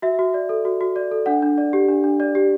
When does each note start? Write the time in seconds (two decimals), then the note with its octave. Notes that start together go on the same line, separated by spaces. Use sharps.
0.02 F#4 E5
0.19 F#4
0.34 D5
0.49 A4
0.65 F#4
0.81 F#4
0.96 D5
1.11 A4
1.26 D4 F#5
1.42 D4
1.58 D5
1.73 G4
1.89 D4
2.04 D4
2.20 D5
2.35 G4